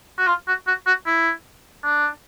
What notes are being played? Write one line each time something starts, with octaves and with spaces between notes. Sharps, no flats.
F#4
F4
F#4
F#4
F#4
E4
D4